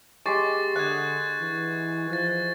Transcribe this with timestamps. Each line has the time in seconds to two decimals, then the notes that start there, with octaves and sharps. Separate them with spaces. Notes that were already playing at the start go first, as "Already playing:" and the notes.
0.26 G#3 G4 C#6 D6 A6 C7
0.76 D3 F#5 D#6 F#6 G#6
1.41 E3
2.10 F3 F#6 A6